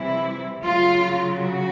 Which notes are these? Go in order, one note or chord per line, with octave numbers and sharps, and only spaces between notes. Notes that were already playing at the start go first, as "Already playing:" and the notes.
Already playing: C3 E3 G3 E4
C#3 F#3 F4
F#4